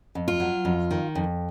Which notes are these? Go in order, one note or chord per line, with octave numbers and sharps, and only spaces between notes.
F2
F4
F#3
F2
D#3
F2